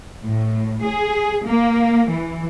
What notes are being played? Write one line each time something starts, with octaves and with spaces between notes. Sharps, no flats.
A2
G#4
A#3
E3